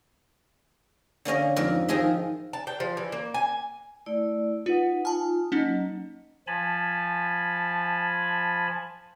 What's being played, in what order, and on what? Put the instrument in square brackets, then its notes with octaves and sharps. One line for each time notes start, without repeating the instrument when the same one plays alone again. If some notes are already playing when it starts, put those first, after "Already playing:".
[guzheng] D3 A#3 C#4 D#5
F2 G#2 A#4
D#3 F3 G#4 D#5 E5
[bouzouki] A5
G5
F3
E3
A#3
G#5
[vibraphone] A3 E4 D5
[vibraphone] D#4 B4 F#5 [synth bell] F4
[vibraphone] D#4 F4 [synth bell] G#5 A5
[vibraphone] F#3 A#3 D#5 [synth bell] C#4 D#4
[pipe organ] F3 G#5 A5 B5